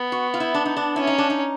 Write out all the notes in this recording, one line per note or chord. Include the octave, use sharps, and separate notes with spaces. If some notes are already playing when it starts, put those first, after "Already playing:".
Already playing: B3
F#4
F4
E4
D4
D#4
D4
C#4 E4
D#4
D4
D#4